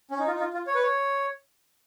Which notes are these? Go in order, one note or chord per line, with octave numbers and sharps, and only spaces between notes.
C#4
D#4
F4
D#4
F4
F4
C#5
B4
C#5